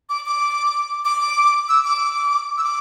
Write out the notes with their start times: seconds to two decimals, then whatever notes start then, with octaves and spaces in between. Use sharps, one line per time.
0.10 D6
0.26 D6
1.05 D6
1.69 E6
1.85 D6
2.58 E6
2.64 D6